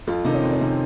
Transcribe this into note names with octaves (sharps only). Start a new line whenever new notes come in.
F2 F4
C3 D#3 D#4
C#4
F2 C4
C#4
C3 D#3